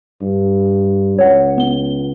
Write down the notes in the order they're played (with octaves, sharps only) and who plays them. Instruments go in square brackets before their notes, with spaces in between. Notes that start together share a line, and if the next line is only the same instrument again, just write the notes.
[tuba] G2
[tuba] C#2 [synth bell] C#5 F#5
[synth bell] B3 G7